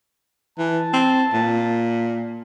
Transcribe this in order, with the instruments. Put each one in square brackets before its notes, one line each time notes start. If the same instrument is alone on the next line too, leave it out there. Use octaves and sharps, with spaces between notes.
[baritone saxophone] E3 [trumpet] A5
[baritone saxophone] C4
A#2